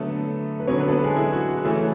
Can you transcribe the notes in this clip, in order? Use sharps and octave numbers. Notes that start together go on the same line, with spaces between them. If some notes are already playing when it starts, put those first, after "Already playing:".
Already playing: D3 F#3 A3 B3 A4
B4
D3 F#3 B3 C#4 C#5
B3 B4
A4
B3 B4
G#3 G#4
E4
F#4
F#4
C#3 E3 A3 C#4 A4